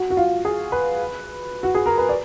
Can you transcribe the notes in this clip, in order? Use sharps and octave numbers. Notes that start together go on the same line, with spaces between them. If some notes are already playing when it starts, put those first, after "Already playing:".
Already playing: F#4
F#4
F4
G#4
B4
F#4
G#4
A#4
B4
D5